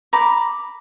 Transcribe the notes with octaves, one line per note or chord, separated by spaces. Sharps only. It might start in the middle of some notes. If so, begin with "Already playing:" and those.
A#5 B5 D6